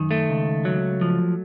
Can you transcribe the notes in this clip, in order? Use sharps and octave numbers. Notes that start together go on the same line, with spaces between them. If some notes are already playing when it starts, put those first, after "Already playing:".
Already playing: F#2 D#3
A3
C#2
F#3
F3